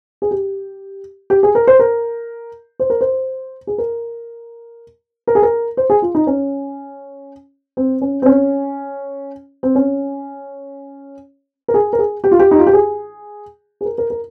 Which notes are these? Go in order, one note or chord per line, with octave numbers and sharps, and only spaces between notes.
G#4
G4
G4
G#4
A#4
C5
A#4
C5
A#4
C5
G#4
A#4
A#4
G#4
A#4
C5
G#4
F4
D#4
C#4
C4
C#4
C4
C#4
C4
C#4
A#4
G#4
A#4
G#4
G4
F4
G4
D#4
F4
G4
G#4
G#4
A#4
A#4
A#4